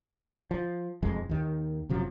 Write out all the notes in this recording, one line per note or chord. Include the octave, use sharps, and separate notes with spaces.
F3
E1 F2 G#3
D#2 D#3
F#1 C3 F3 F#3